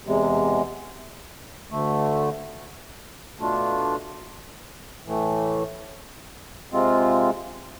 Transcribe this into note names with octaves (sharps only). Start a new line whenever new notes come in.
E2 C3 G#3
D2 D3 A3
B2 A3 D4 F4
A2 E3 A3
C3 G#3 C4 F4